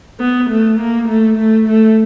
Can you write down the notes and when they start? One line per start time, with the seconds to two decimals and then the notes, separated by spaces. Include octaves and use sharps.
0.20 B3
0.50 A3
0.79 A#3
1.08 A3
1.37 A3
1.68 A3